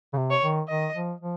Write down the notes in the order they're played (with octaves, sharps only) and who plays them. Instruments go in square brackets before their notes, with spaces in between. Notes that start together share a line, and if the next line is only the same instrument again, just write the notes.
[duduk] C#3
C3
[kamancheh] C#5
[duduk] D#3
[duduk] D#3 [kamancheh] D#5
[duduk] F3
F3